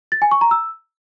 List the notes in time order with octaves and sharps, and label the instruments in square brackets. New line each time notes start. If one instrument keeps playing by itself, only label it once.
[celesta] A6
G#5
C#6
A#5
E6